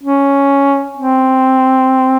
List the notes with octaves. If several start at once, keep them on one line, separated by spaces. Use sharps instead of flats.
C#4
C4